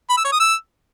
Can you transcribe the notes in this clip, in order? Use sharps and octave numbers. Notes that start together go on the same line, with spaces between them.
B5
E6
C#5
D#6
E6